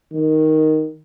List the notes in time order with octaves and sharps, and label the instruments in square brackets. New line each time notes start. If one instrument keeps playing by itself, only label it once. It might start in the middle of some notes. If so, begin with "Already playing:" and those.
[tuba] D#3